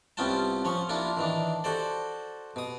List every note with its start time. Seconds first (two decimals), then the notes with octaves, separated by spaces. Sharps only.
0.17 C2 B3 C#4 F4 G5 A5
0.65 F3 C#4 C#5
0.89 A#3 D4 E4 F4
1.17 D#3 E3 D4
1.64 F#4 A4 C5 D5
2.56 B2 D#6